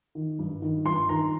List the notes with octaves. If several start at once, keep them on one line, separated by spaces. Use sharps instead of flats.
D#3
G2
D#3
G2 C6
D#3 A#5